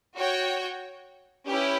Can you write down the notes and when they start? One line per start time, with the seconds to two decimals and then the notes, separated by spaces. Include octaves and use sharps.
0.17 F#4 C#5 G5
1.48 C#4 E4 G4 B4